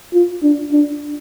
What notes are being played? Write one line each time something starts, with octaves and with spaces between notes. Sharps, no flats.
F4
D4
D4